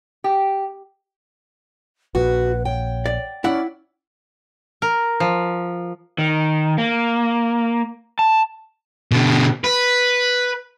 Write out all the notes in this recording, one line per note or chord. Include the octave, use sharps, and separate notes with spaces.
G4
A#1 F#4 B4
C#5 G5
D5
C#4 E4 D5 F#5
A#4
F3
D#3
A#3
A5
B2 D3
B4